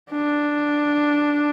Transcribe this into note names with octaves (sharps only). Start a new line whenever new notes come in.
D4